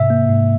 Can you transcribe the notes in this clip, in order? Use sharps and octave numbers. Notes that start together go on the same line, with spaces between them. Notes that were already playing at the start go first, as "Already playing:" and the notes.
Already playing: G#2 C3 E5
A#3
G#2